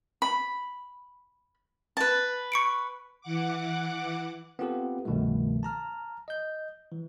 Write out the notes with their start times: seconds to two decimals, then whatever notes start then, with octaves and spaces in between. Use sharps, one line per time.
0.22 B5
1.97 B4 A5
2.52 C#6 C#7 D7
3.21 E3 F#5 D6
4.59 B3 C4 F4 G4 A4
5.05 C2 G2 B2 D#3 F3 A3
5.63 A5 A#5 F6
6.28 D#5 G6
6.92 E3